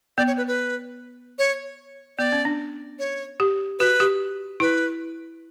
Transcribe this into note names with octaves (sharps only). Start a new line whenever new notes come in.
B3 D5
C#5
B4
B4
C#5
B3 D5
C#4
D4
C#5
G4
F#4 B4
G4
E4 B4